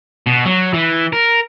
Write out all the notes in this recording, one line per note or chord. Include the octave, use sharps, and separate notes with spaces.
B2
F#3
E3
A#4